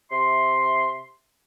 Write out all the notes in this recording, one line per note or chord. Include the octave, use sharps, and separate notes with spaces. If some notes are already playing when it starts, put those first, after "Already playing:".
C3 E5 C6